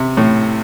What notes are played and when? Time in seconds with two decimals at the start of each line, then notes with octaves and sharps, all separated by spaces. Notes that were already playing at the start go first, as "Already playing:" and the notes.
Already playing: C3
0.17 A2